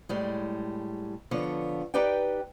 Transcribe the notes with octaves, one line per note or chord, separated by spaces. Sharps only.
A2 G3 G#3
D3 F3 B3 C#5
D#4 G4 B4 D5 G5